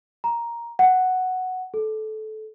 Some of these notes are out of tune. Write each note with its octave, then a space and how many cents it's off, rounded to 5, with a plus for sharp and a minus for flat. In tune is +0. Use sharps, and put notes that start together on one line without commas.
A#5 +5
F#5 +0
A4 -20